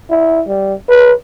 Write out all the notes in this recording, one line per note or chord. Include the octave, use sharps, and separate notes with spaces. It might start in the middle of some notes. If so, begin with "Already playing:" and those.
E4
G3
B4